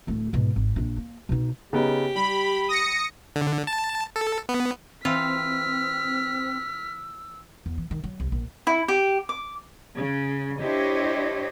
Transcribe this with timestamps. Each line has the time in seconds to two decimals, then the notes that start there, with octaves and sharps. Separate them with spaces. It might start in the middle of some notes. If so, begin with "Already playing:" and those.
0.07 D1 A3
0.33 G#2 B2
0.56 G#1
0.76 A#1 D4
0.98 A#3
1.29 B2 D#4
1.73 C#3 B3 D#4 G4
2.15 G3 B5
2.68 D#6 A#6 C#7
3.36 D3
3.67 A5
4.16 A4
4.49 B3
5.05 E3 C4 F4 E6 F6 B6
7.66 E2
7.78 E3
7.91 D#3
8.04 F#3
8.20 C2
8.32 A#1
8.67 E4
8.88 G4
9.29 D6
9.97 C#3
10.60 D4 E4 G4 C5 C#5 D#5